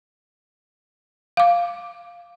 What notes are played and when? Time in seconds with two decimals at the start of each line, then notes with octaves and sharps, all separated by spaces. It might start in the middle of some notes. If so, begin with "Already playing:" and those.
1.37 F5 D6